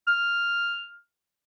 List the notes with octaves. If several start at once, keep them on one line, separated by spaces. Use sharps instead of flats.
F6